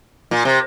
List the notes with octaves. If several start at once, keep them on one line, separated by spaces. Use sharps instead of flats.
A#2
C3